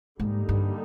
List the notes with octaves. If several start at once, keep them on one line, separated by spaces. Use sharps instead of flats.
G#2 D3 G3 A#3 D#4
G2